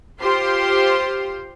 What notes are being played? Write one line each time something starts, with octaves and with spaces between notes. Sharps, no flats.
F4 G4 C5 C6